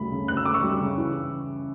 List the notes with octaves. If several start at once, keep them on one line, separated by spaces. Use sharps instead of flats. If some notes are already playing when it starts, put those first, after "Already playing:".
Already playing: D2 C#3 G3 B5
C#3
D2 F#6
E6
D2 D6
C#6 E6
G3
C#3
E3